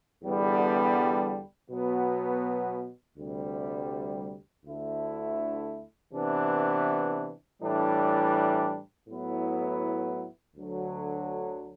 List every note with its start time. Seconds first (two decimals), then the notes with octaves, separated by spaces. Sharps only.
0.23 E2 D3 G3 B3
1.70 B2 F#3 B3
3.19 D2 C3 G3
4.66 D2 D3 A3 E4
6.13 C3 E3 B3 D4
7.61 A2 E3 G3 D4
9.08 A2 F#3 B3 E4
10.56 D2 D3 F#3